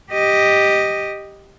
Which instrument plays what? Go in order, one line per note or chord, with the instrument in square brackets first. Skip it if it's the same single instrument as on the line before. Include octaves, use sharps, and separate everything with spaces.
[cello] G4 D#5